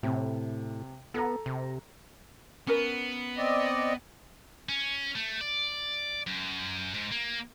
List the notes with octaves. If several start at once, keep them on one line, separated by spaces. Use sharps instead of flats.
A2 C3
B3 A4 A#5
C3
B3 C#4 A#4
C4 D5 D#5
C#4
A3
D5
F#2
G#2
A#3